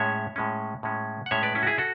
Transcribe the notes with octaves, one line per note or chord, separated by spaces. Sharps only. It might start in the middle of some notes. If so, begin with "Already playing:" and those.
Already playing: A2 G#3 C#4 C#5 E5
A2 G#3 C#4
A2 G#3 C#4
F#5
A2 G#3 C#4 C#5 E5
B4 D5
C#4 E4
F#4
E4 G#4
F#4 A4